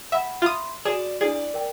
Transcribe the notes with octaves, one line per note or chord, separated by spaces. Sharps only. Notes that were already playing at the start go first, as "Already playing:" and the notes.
E5 F#5 B5
F4 E5 B5 C6 D#6
F#4 G#4 D5 E7
D4 E4 G#4 D5
A#4 G5